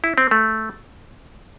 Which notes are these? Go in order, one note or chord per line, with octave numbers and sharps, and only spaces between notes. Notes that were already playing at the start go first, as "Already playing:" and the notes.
E4
C4
A3